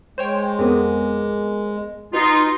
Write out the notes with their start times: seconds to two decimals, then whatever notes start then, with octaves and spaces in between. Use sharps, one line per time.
0.18 G#3 C5 C#5 G5
0.59 F2 B3 G#4 A#4 C5
2.13 D#4 F4 F#4 B4